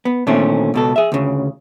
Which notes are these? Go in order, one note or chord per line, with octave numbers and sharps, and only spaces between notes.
B3
A#2 D3 D#3 A3 C4 C#4
C#2 B2 A4
G#4 E5
D2 C#3